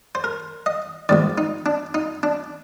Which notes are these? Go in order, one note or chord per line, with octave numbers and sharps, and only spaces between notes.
C5
A#4
D#5
A#1 G#2 D#3 D5
D#4
D4
D#4
D4